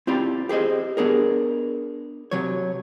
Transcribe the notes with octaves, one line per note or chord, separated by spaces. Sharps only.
C4 E4 F4 G4 D5 B5
G4 G#4 C5 D#5
B3 D4 G#4 A#4
C3 F#3 C#5